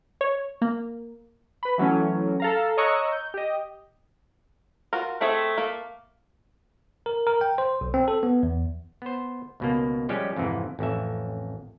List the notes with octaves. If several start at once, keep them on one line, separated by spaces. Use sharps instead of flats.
C#5
A#3
B4 B5
E3 F#3 A3 C#4
A4 F5 A#5
C#5 D#5 A#5 C#6 E6 F#6
G6
G4 D#5
F4 F#4 A#4
A3 C4 G#4 E5
A#3
A#4
A#4
G5
C5
B1
C4
A4
B3
E2
B3 C5
C#2 B2 A#3
F3 G3 G#3 C#4 G4
F2 G#2 C3 E3
A1 F2 E5